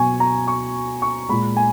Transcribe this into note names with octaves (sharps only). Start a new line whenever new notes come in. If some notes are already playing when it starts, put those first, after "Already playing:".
Already playing: B2 F#3 G#5 C#6
A#5
C#6
C#6
A#2 G#3 B5
G#5